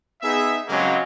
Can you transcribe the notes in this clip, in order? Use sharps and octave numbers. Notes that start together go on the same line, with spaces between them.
B3 D#4 G#4 E5
C#3 F#3 G#3 A#3 C4 G4